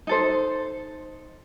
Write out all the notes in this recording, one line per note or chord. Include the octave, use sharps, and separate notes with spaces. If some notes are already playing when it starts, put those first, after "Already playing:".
D#4 A4 C5